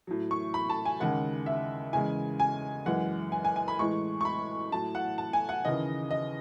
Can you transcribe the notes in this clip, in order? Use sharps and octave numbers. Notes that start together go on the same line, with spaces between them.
A2 F#3
C#6
B5
A5
G#5
D#2 C#3 G#3 F#5
E5
E2 C#3 G#3 G#5
G#5
F#2 E3 G#3 F#5
G#5
G#5
G#5
B5
A2 E3 G#3 C#6
C#6
B5
A2 F#3 A5
F#5
A5
G#5
F#5
D#2 C#3 E3 D#5
D#5